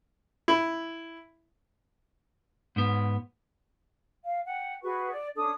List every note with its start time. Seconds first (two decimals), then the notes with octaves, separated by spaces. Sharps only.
0.48 E4
2.76 G#2 B3
4.24 F5
4.45 F#5 G5
4.83 F#4 G#4 B4 C#6
5.12 D5
5.35 C#4 D4 A4 D#6